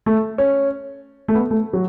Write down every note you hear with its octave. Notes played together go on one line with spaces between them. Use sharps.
A3
C#4
A3
B3
A3
F#3